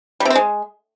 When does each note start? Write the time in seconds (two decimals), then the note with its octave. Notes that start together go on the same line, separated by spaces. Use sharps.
0.20 G3
0.25 C3
0.30 C4
0.35 G#3